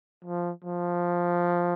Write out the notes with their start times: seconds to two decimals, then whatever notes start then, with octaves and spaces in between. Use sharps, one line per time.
0.25 F3
0.65 F3